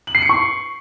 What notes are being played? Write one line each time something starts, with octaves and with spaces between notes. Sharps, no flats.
F#7
C7
C#7
C#6